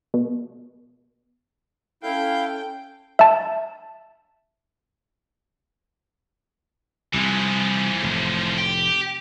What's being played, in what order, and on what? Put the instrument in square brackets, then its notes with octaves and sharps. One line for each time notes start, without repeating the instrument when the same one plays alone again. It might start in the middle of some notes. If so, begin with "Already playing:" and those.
[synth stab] B2
[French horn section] C#4 A4 [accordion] E4 F5 G6 [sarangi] G5
[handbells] E5 A5
[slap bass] C2 [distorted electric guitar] E3 F3
[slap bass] F1 A2
[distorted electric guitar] G4